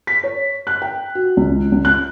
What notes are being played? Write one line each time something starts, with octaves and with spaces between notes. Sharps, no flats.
B6
C#5
F#6
G5
F#4
C#2
C#2
F#6